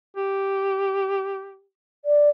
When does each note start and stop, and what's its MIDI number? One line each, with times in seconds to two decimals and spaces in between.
0.16 1.66 67
2.05 2.30 74